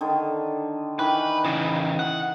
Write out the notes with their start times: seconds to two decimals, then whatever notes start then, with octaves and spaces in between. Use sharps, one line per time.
0.01 D3 D#3
0.99 D#3 E3 D#4 B4
1.44 C#3 E3 D#5
1.99 F#5